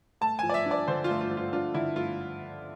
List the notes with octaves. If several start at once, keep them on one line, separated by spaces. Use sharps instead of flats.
A3 A5
F3 G#5
D5
E5
D4
D5
D3 C5
F4
A3
F4
F3
F4
D4 F4
D3 E4
A3 F4